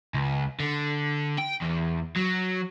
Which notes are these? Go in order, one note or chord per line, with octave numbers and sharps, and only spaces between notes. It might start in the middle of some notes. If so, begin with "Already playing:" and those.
C#2
D3
G5
E2
F#3